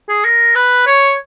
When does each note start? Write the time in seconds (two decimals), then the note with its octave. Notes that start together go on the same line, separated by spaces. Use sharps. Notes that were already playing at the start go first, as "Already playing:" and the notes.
0.09 G#4
0.25 A#4
0.55 B4
0.87 C#5